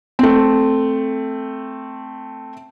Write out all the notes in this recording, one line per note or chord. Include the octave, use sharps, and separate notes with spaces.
A3 C4